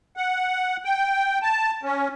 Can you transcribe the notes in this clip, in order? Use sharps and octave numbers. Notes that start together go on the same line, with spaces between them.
F#5
G5
A5
C#4